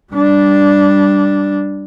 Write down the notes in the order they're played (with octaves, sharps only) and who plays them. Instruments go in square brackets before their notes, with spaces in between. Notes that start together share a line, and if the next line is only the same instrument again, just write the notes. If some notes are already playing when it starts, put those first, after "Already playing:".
[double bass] G3 D4